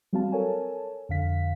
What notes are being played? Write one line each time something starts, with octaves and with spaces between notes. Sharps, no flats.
F#3 G3 C4 F#4 F5 A5
A4 A#4 C#5 G#5 A5
F2 D3 F5 B6